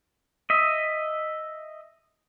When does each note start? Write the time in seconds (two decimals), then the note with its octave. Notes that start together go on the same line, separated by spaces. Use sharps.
0.50 D#5 E5